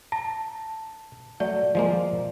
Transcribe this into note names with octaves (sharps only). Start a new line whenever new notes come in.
A5 A#5
F#3 A3 D5
F3 G#3 A#3